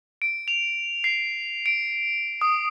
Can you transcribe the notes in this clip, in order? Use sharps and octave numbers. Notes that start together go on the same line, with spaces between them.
D7
F7
C7
D7
D#6